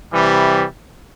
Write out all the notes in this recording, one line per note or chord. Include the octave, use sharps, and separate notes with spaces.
C3 E3 G3